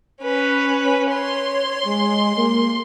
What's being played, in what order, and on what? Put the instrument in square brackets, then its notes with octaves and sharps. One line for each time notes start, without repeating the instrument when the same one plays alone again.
[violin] C#4 B4
[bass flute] C#5 [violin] C6
[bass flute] G#3
A#3